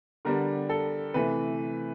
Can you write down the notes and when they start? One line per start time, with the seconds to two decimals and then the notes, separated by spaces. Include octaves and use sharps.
0.25 D3 G3 B3 D4 A#4
0.69 A4
1.14 C3 E3 A3 B4